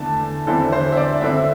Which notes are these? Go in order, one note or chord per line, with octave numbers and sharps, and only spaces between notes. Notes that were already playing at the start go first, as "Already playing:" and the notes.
Already playing: E2 D3 A3 A5
E2 D3 C4 E4 A4
C5
E5
D5
D3 C4 E4 E5